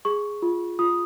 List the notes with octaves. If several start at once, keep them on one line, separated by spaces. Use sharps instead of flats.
G#4 C#6
F4
F4 D#6